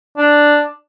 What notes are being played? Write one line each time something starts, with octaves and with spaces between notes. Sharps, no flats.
D4